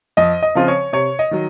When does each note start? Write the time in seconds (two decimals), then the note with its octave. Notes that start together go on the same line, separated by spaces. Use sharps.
0.17 F2 D#5
0.42 D#5
0.55 C#3 F3 C4 F4
0.68 C#5
0.93 C3 C#5
1.19 D#5
1.31 D#3 F#3